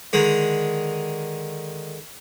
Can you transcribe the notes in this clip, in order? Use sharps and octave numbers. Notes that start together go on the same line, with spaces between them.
D3 D#3 G#3